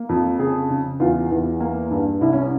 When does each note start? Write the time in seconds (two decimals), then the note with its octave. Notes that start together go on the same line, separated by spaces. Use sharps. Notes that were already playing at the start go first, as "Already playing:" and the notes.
Already playing: A#3
0.09 F2
0.39 C#3 G#4
0.70 C#3
1.00 E2 F4
1.31 E2
1.60 A#3
1.90 G2
2.21 C2 E4
2.33 C#4